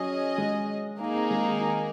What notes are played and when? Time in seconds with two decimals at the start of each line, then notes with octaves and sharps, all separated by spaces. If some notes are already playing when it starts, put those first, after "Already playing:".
Already playing: F#3 C#4 G#4 D#5
0.38 G#3
0.99 A#3 D#4 G#4
1.15 C4
1.31 G#3
1.45 D#3
1.61 D#3